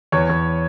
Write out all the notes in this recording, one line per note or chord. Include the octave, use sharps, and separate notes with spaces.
E2 C#5
E2